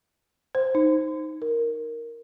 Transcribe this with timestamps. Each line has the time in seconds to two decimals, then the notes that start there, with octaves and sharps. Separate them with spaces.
0.55 C5
0.75 D#4
1.42 A#4